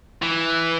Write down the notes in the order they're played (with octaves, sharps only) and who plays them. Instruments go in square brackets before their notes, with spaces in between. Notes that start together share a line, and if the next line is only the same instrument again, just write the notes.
[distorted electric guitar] E3